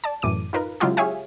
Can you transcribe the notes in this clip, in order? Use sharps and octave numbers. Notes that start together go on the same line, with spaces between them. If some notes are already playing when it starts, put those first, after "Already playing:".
D5 A5
F#2 A2 E3 D6 D#7
D#4 F4 A#4 B4
C#3 F#3 G#3 E4 F4 G4
G4 G#4 C#5 E5 F5 G#5